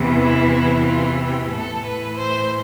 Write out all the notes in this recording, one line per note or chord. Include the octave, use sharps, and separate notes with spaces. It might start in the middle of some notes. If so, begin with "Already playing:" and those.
Already playing: E2 C3 E3
E4
F4
G4
A2 E3 A4
B4
C5